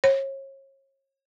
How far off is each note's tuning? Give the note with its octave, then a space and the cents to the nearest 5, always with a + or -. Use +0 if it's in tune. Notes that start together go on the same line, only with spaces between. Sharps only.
C#5 -35